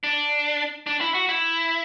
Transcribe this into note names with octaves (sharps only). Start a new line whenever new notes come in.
D4
D4
E4
F#4
E4